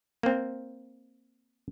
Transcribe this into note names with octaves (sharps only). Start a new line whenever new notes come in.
A#3 C4